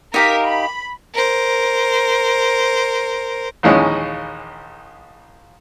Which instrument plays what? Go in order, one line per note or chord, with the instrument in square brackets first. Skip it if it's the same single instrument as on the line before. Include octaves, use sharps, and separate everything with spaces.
[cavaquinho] D#4 G4 F5 [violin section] A#4 B6
[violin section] B5
[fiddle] A#4 C5
[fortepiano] A#1 D#2 E3 G#3 C#4 D#4